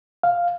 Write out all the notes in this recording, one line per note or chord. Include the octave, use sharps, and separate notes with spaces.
F5